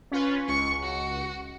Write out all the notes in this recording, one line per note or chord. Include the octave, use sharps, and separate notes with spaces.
C#4 F4 B4
C#2 C#6 C#7
F#4